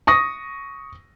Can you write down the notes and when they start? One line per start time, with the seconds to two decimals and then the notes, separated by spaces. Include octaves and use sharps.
0.07 C#6 D#6 A#6